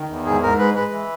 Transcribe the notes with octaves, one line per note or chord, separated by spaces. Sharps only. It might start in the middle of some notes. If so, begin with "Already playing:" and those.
Already playing: D#3
E2
G#2 G#4
G#2 A#4
G#3 B4
G#3 B4
E3